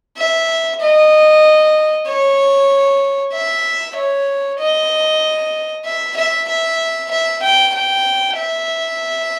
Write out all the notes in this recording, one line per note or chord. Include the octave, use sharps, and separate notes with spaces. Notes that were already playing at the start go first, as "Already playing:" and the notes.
E5
D#5
C#5
E5
C#5
D#5
E5
E5
E5
E5
G5
G5
E5